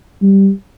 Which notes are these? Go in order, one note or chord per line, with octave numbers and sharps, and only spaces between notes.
G3